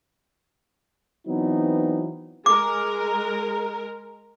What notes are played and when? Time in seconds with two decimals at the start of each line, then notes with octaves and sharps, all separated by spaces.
1.26 E3 F#3 B3 C4 D#4
2.46 G#3 A#4 D6